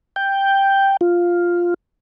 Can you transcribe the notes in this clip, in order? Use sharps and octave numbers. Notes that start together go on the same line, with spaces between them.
G5
F4